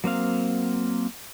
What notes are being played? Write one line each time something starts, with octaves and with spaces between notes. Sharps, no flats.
F#3 A#3 C4 F5